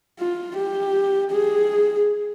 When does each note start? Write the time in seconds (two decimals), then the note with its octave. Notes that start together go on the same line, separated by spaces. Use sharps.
0.19 F4
0.57 G4
1.31 G#4